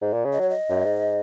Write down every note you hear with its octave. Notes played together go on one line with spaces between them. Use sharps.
G#2
A#2
C#3
D#5
F#3 C#5
D#5
F#2
G#2